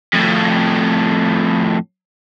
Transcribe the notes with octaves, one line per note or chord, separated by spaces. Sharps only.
F2 A2